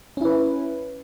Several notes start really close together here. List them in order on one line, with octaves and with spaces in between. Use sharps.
C#4 E4 B4